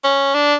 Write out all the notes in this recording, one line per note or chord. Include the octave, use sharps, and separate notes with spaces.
C#4
D4